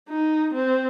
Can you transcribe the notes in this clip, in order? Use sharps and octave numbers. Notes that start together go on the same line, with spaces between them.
D#4
C4